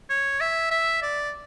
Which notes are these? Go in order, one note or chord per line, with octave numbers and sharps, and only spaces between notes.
C#5
E5
E5
D5